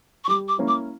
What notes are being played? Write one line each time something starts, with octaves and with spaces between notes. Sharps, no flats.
C#6
G3 D6
D6
A#3 C#4 E4
D6